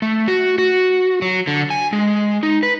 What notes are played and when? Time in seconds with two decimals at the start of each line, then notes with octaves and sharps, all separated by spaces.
0.02 A3
0.28 F#4
0.58 F#4
1.22 F#3
1.47 D3
1.70 G#5
1.93 G#3
2.43 D#4
2.63 B4